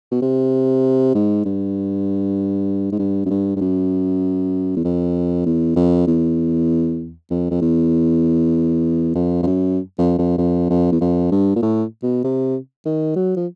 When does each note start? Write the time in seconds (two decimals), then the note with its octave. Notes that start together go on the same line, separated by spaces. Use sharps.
0.11 B2
0.22 C3
1.15 G#2
1.45 G2
2.92 G#2
2.99 G2
3.25 F#2
3.30 G2
3.56 G2
3.61 F#2
4.76 E2
4.84 F2
5.46 E2
5.76 F2
6.07 E2
7.30 F2
7.50 F2
7.61 E2
9.15 F2
9.43 F2
9.47 F#2
9.98 F2
10.19 F2
10.38 F2
10.69 F2
10.92 E2
11.00 F2
11.31 G2
11.56 A#2
11.62 A2
12.03 B2
12.24 C3
12.85 D#3
13.16 F#3
13.36 F3